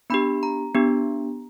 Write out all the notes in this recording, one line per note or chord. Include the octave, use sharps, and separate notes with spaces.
B3 D4 G4 B5
A#5
B3 D4 G4